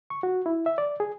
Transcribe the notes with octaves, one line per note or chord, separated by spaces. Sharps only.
C#6
F#4
E4
E5
D5
G#4